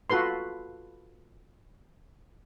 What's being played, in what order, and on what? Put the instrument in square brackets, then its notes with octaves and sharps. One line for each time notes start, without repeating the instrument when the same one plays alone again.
[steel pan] F4 F#4 A4 B4 C6